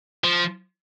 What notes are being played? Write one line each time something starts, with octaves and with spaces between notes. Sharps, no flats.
F3